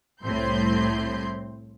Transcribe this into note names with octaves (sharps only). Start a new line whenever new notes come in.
C2 A2 C4 C6 G6